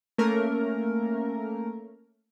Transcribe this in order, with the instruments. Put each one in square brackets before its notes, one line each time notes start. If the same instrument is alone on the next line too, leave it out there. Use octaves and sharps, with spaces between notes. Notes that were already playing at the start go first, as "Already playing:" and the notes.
[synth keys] A3 A#3 C#4 A#4